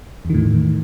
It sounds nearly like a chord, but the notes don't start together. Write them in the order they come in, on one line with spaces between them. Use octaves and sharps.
E2 D#3 A2